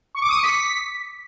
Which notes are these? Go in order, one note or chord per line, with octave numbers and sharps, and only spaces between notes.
C#6
D6
D#6
C#7
B6